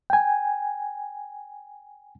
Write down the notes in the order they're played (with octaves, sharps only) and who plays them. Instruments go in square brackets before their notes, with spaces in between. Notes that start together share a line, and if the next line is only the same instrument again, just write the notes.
[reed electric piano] G5 G#5